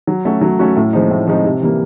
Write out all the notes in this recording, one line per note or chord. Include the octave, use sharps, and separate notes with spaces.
F#3
A3 C#4 F#4
F#3
A3 C#4 F#4
A2
F3 G#3 C4 D#4
A2
F3 G#3 C4 D#4
C3
E3 G3 A#3